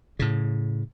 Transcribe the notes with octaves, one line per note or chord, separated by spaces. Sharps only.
A2 C#3